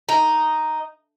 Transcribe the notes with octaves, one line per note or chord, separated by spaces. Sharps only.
D#4